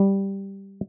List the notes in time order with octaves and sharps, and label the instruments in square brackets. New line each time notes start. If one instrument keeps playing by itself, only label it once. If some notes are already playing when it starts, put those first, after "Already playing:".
Already playing: [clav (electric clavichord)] G3